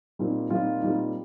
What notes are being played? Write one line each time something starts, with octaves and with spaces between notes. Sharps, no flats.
A#2 G3 C4 D#4
A#2 G3 C4 D#4 F4
A#2 G3 C4 D#4